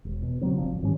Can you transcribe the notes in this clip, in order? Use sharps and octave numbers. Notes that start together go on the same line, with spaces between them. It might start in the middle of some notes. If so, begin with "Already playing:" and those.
E1
B2
C#3 E3 F#3 C4
F1 F3 C4 D4
G#1
G#2 D#3 G3 C#4